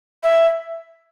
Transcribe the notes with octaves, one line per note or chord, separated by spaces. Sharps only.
E5